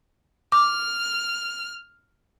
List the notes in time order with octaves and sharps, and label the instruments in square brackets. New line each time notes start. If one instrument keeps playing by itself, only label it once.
[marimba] D6 [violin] F6